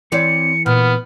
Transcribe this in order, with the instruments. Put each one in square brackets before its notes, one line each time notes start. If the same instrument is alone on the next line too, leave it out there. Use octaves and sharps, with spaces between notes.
[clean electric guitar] E3 [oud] C4 C#5 D5 [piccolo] C#7
[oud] A#2 [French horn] B3 [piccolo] F6